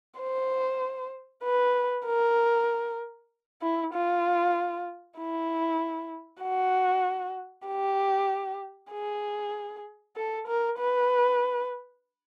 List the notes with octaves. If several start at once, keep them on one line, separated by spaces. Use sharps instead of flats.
C5
B4
A#4
E4
F4
E4
F#4
G4
G#4
A4
A#4
B4